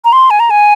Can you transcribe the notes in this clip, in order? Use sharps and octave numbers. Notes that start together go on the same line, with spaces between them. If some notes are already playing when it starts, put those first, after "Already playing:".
A#5
C6
G#5
A#5
G#5